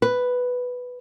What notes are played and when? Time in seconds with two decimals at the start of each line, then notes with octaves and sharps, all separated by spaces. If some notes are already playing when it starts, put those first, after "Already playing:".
0.02 B4